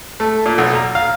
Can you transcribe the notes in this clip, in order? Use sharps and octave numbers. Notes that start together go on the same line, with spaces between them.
A3
A#2
B1
A#5
F5